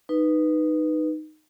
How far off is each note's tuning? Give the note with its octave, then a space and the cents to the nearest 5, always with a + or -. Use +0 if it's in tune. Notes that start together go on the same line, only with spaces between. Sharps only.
D#4 -10 B4 +0